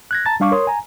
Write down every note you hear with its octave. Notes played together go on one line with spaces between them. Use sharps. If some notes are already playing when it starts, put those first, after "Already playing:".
F#6 G#6 A#6
A5 A#5 A6
G3 D4 F5 C#6 D6
A#4 C#5 C6 D#6
G#5 A#5